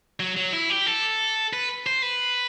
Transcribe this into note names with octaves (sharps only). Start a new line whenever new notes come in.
F#3
F#3
E4
G4
A4
B4
C5
B4